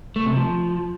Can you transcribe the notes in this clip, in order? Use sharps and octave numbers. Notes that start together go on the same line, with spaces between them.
A3
C3
F3